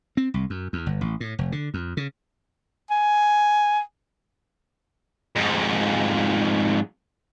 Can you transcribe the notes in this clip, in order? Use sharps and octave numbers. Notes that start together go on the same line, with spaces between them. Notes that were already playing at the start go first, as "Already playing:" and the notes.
C4
C2
F#2
E2
G1
A1
A2
F1
D3
F2
C#3
G#5
F2 G#2